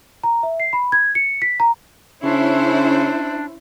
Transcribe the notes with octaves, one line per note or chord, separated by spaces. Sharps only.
A#5
E5
C7
B5
G#6
C#7
B6
A#5
C#3 C#4 D4 E4 C5